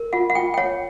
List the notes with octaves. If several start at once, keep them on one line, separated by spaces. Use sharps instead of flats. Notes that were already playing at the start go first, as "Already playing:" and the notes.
Already playing: A#4
F4 F#5
F#5
F4 G5
G5
C#5 F#5